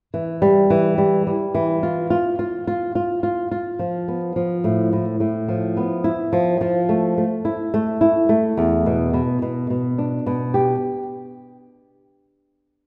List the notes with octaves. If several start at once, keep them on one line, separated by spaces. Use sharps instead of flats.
E3
G3
E3
G3
G3
E3
F4
F4
F4
F4
F4
F4
F4
F3
B3
F3
A2
A2
A2
F3
B3
E4
F3
F3
A3
A3
E4
A3
E4
A3
E2
B2
B2
B2
B2
D4
B2
G4